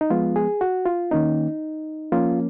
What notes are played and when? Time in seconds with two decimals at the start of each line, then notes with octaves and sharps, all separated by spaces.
0.01 D#4
0.10 F3 G#3 B3 F4
0.36 G#4
0.61 F#4
0.86 F4
1.11 D#3 A#3 C#4 D#4
2.12 F3 A#3 C#4 F4